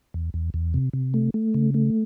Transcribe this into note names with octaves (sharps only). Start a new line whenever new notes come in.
E2
E2
E2
C3
C3
A3
A3
C#3
A3